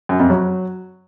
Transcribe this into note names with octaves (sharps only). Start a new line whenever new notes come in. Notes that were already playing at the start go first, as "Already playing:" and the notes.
F#2
F2
F#3